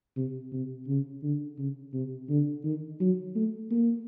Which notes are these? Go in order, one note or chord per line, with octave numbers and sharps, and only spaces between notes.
C3
C3
C#3
D3
C#3
C3
D3
D#3
F#3
A3
A#3